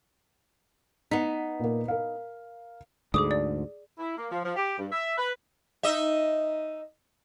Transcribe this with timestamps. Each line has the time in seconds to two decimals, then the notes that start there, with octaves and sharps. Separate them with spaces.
1.11 B3 D#4 B6
1.60 A#2 A#3
1.88 A#4 F5
3.14 D2 G#2 D3 G#4 D6 D#6
3.31 D5
3.99 E4
4.18 A#3
4.31 F3
4.45 F3
4.56 G4
4.79 G2
4.92 E5
5.18 B4
5.83 D#4 D#5 E5